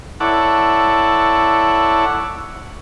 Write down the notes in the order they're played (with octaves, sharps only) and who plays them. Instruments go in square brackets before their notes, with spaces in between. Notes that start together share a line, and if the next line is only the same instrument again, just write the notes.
[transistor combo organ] E4 A4 C#5 D5 F#5